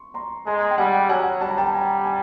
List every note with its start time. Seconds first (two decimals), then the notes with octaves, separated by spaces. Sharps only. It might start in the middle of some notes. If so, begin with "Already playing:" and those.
Already playing: C6 C#6
0.14 A#5 C6
0.46 G#3 A#5 C6
0.71 G5
0.78 G3 F#5 G#5
1.09 F#3 F#5 G#5
1.41 G3 A5
1.49 A#5
1.58 G5 A5
1.73 G#5 A#5
2.04 G#5 A#5